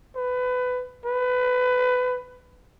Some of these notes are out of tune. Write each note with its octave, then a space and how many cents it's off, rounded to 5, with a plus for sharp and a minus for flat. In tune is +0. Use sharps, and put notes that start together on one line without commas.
B4 +20
B4 +20